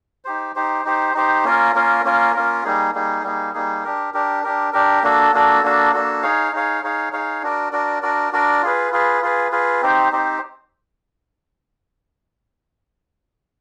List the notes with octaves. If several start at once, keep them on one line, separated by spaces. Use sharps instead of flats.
D#4 G4 C5
D#4 G4 C5
D#4 G4 C5
D#4 G4 C5
A#3 C#4 F4 A#4
A#3 C#4 F4 A#4
A#3 C#4 F4 A#4
A#3 C#4 F4 A#4
G3 A#3 D#4 G#4
G3 A#3 D#4 G#4
G3 A#3 D#4 G#4
G3 A#3 D#4 G#4
D4 G4 A#4
D4 G4 A#4
D4 G4 A#4
D4 G4 A#4
A#3 D4 F#4 A4
A#3 D4 F#4 A4
A#3 D4 F#4 A4
A#3 D4 F#4 A4
D#4 G#4 C#5 F5
D#4 G#4 C#5 F5
D#4 G#4 C#5 F5
D#4 G#4 C#5 F5
D4 F#4 A#4 D5
D4 F#4 A#4 D5
D4 F#4 A#4 D5
D4 F#4 A#4 D5
F4 G#4 B4
F4 G#4 B4
F4 G#4 B4
F4 G#4 B4
C4 D#4 G4 C5
C4 D#4 G4 C5